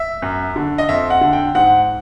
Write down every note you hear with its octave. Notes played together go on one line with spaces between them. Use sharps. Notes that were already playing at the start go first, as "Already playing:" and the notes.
Already playing: E5
F#2
D3
D#5
F2 E5
F#5
D3
G5
G#2 F#5